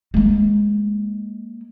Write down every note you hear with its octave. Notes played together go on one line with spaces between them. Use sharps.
G#3 A#3